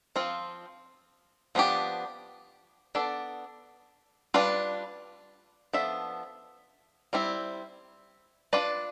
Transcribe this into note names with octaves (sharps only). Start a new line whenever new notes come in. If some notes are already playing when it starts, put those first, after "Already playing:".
F3 C4 F4
F3 B3 D4 G4
B3 D4 A4 D5
G3 D4 F4 B4
F3 B3 D4 A4 E5
G3 C4 E4
D4 F4 B4 D5